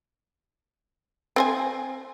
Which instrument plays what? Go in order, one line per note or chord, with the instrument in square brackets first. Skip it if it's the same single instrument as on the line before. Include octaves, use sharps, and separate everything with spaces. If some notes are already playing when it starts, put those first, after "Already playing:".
[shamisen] C4 C5 G#5